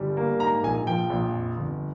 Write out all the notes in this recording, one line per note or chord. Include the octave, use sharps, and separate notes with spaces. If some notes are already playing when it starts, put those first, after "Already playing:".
Already playing: G1 G3
A#3
G#2 A#5
A#1 G#5
F3 G5
A#1
F2
G1